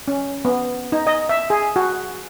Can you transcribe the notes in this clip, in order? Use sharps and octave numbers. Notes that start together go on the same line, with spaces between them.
C#4
B3
D#4
D#5
E5
G#4
F#4